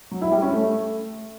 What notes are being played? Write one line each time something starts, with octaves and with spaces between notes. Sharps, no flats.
F#3
E4
G3
C#4
A3